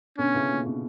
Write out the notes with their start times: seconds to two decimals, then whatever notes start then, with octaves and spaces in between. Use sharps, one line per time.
0.18 B2 D3 C#4
0.34 C#3 E3
0.50 A#2
0.66 B2